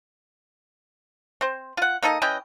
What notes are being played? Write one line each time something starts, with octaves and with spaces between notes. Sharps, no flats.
C4 C5
F4 F#5
A#3 D#4 A4 D#5
E3 C#4 D#5 G5